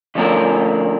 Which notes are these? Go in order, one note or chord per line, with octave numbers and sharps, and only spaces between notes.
D3 F3 A3 C#4 D4 A#4